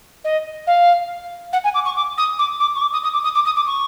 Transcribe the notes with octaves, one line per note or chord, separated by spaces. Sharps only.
D#5
F5
F#5
G#5
D6
C#6
D6
D#6
D6
D6
C#6
D6
D#6
D#6
D6
D#6
D6
D#6
D6
C#6